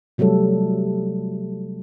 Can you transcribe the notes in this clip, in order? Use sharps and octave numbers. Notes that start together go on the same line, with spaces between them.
C3 F#3 G3 A3 A4